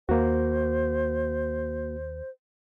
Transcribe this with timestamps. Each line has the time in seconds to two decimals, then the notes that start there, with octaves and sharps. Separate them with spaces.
0.09 D#2 A#3 F#4 C5